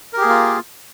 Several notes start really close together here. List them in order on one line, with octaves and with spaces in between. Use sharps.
A#4 G4 G#4 A#3 F4